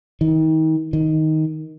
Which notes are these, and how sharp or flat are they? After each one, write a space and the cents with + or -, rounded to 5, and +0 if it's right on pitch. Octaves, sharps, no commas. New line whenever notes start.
D#3 +35
D#3 +10